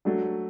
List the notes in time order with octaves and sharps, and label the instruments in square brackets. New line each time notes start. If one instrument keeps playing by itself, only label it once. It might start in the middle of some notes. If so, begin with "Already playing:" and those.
[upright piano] F#3 A3 D4 F#4